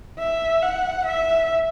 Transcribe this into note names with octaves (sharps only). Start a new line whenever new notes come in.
E5
F#5
E5